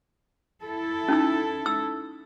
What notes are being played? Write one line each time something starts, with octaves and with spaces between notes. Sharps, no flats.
E4 A4
C#4 D#4 E6
E6